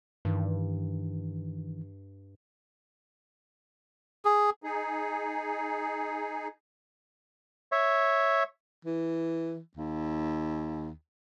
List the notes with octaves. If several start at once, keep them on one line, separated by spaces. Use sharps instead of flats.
G2 D#3 E3
G#4
D#4 G#4
C#5 E5
E3
D#2